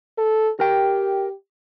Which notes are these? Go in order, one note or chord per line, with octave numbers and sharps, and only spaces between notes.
A4
G4 A#4 G5